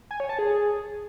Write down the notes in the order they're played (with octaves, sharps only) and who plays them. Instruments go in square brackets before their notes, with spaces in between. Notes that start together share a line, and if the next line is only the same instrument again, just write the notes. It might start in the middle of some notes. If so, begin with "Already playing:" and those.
[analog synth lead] G#5
C#5
A5
G#4